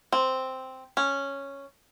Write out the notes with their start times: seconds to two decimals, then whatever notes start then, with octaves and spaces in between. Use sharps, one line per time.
0.12 C4
0.97 C#4